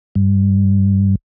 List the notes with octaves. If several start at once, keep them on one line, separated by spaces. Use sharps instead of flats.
G2